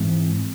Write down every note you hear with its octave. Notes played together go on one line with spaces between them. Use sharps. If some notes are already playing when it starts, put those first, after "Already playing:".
Already playing: G#2 E3 G#3 C4